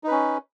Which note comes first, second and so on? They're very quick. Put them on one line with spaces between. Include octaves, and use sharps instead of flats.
D#4 B4 C#4